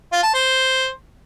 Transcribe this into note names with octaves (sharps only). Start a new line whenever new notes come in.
F4
A5
C5